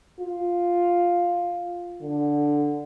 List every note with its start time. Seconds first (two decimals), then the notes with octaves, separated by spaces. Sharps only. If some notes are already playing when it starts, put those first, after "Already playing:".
0.19 F4
2.01 D3